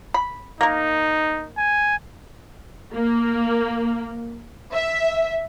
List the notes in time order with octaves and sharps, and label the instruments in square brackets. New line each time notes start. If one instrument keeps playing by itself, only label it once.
[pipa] B5
[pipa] A#3 A#4 [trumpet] D#4
[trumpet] G#5
[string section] A#3
E5